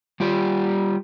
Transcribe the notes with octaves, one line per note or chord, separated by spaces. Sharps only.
G3 F4 G4 D5